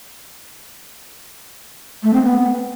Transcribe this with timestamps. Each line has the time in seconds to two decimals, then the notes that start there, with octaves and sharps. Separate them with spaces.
2.03 A3
2.13 C4
2.24 B3